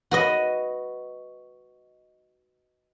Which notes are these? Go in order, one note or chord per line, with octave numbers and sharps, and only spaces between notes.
F#4 B4 D#5